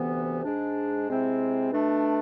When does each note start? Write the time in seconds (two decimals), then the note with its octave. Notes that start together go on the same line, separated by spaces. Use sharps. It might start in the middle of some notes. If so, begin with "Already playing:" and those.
Already playing: D2 C3 E3 B3
0.44 G#2 G#3 D4
1.07 C3 G#3 C4 E4
1.71 B2 A3 D4